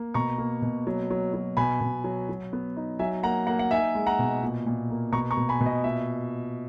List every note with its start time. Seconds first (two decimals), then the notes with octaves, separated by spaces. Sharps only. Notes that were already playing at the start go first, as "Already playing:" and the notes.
Already playing: A#3
0.14 B2 A#5 C#6
0.38 A#3
0.62 B2
0.87 F#3
1.10 F#3
1.34 F#3
1.57 B2 G#5 B5
1.81 B2
2.04 F#3
2.29 F#3
2.53 B3
2.77 D#4
2.99 F#3 E5 G#5
3.23 A#3 F#5 A#5
3.47 A#3 F#5 A#5
3.59 F#5
3.71 D#4 E5 G#5
3.95 G#3
4.07 F#5 A#5
4.19 B2
4.42 A#2
4.66 A#2
4.90 A#3
5.13 B2 A#5 C#6
5.31 A#5 C#6
5.37 B2
5.49 G#5 B5
5.61 B2
5.66 D#5
5.84 A#2 E5